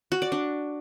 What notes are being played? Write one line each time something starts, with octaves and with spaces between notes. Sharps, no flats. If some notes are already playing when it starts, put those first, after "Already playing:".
F#4
D5
D4